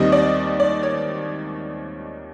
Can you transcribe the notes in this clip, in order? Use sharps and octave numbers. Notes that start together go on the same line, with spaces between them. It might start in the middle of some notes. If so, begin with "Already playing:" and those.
Already playing: D#2 D#3 G3 C4 D#5
D5
D5
C#5